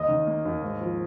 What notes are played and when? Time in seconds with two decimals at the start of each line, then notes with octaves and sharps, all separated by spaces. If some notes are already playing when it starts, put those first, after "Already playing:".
Already playing: D#2 D#5 D#6
0.08 D#3
0.27 A#3
0.45 D#2
0.62 G#2
0.81 F3